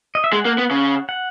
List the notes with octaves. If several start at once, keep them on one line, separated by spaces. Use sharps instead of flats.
D#5
E5
G#3 F#5
A#3
B3
C#3
F#5